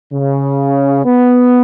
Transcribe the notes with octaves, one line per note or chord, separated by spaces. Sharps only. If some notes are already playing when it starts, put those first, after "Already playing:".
C#3
B3